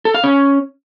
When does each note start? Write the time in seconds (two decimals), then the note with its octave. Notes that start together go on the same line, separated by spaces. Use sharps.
0.05 A4
0.14 F5
0.24 C#4